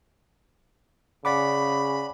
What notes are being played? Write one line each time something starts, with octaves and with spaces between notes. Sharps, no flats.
C#3 D5 F#5 B5 D6